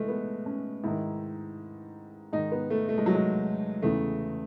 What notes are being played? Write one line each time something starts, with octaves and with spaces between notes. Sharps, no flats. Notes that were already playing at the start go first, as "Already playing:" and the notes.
Already playing: A2 E3 G#3 A3
B3
C#4
G#2 D#3 E4
G#2 D#3 D#4
B3
A3
A3
G#3
F#3
G#3
E2 C#3 E3 A3